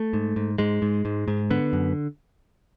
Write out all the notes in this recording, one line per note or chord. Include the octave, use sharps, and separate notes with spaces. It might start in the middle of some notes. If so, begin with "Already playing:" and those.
Already playing: A3
G#2
G#2
G#2 G#3
G#2
G#2
G#2
D3 B3
F#2